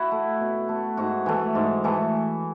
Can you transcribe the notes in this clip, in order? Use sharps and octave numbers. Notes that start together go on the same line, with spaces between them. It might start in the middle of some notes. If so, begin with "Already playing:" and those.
Already playing: E4 F#4
A3
B2
A3
G#2 F#4
E3 A3
G#2
E3 A3